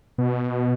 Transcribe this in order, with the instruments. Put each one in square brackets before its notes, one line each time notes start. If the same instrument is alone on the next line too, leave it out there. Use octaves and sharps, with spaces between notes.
[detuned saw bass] B2